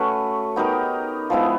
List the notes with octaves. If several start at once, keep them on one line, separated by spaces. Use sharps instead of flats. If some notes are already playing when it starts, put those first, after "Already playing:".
Already playing: A3 C#4 F#4 B4
B3 D#4 G4 A#4
F3 G#3 B3 E4